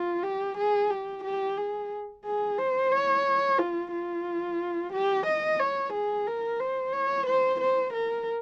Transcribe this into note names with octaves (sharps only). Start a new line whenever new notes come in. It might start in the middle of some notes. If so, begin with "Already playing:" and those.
Already playing: F4
G4
G#4
G4
G4
G#4
G#4
C5
C#5
F4
F4
G4
D#5
C#5
G#4
A#4
C5
C#5
C5
C5
A#4